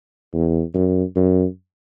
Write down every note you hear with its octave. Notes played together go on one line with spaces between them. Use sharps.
E2
F#2
F#2